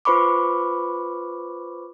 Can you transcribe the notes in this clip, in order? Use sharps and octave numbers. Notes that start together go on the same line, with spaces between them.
F4 B4 C5 B5 C#6 D6